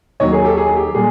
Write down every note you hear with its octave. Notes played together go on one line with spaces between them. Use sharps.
D#2 D#3 F#3 C#5 D#5
G#4 A#4
G4 A4
G#4
G4
A#2 G3 G#4